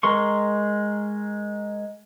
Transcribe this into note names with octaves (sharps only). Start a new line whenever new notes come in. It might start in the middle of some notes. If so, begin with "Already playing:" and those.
G#3 A#4 C6 C#6